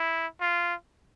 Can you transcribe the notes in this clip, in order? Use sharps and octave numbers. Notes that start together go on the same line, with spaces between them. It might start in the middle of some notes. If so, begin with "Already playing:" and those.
Already playing: E4
F4